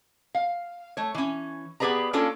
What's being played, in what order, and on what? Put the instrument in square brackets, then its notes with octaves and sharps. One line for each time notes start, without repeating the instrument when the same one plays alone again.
[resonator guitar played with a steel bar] F5
A3 C#5
E3 C#4
B3 G4 G#4 B4 D5 A#5
A#3 C#4 D4 F4 A4 C#5